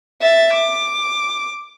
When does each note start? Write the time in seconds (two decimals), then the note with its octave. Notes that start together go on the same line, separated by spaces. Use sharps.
0.22 E5 A6
0.54 D6